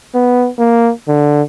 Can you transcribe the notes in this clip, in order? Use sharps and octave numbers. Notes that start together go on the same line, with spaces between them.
B3
A#3
D3